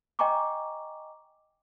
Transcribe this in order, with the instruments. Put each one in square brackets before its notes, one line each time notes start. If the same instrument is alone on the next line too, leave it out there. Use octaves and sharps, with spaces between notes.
[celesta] D#5 G5 G#5 A#5 C#6 D6